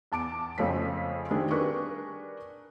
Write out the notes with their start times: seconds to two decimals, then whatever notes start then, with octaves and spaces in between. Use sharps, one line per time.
0.12 E2 A5 D6 D7
0.58 F2 C#3 F3 A3 C4 B6
1.31 D#3 G3 A3 C4 D4 G#4
1.51 D4 G4 G#4 A#4 B4 C#6